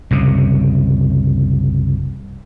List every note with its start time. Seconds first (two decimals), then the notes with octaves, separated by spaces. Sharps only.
0.11 C2 F#2 C#3